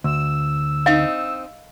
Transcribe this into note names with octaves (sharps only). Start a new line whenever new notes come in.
D2 E6
C4 D#4 D#5 F5